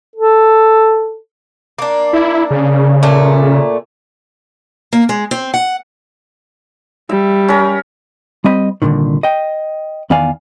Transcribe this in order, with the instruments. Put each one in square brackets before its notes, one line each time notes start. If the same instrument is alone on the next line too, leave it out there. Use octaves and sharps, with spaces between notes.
[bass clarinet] A4
[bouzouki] A#3 D4
[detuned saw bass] E4
C#3
[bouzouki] A#2 A3
[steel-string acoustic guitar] A#3
G#3
C4
F#5
[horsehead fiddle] G3 [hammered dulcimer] E5
[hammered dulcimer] C#4 A#4
[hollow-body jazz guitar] G3 C4 D#5 B5
C2 F2 A#2 D3 D#3
D#5 G5
E2 D#3 B3 D5 F5 G#5